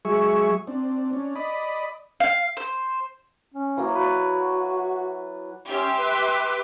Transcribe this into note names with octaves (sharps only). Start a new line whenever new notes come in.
F#3 G#3 G#4 E5 C#6
C4 D4
C#4 D4
D5 D#5 B5
F5
C5
C#4
E3 F#3 A#3
F#4 B4 D5
C#4 G4 E5 C6
B4 D6